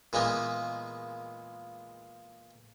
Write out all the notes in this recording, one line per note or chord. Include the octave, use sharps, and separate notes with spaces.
A#2 E3 G#3 A#3 B3